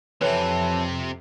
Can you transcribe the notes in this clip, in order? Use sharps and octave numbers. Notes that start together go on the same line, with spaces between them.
F2 C3 E3 C4 A4 B4 C#5 F#6